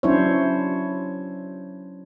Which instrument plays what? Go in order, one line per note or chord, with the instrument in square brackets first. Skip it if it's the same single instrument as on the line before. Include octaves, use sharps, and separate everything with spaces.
[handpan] F#3 C#4 D4 E4 C5 C#5